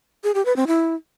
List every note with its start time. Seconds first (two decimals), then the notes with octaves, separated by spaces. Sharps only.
0.24 G#4
0.35 G4
0.45 B4
0.56 C4
0.67 E4